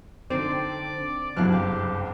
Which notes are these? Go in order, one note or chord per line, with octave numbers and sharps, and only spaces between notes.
D3 C4 D#4 C5 D5 D6
F#1 C2 G2 F#3 E4 F6 F#6
G4 F5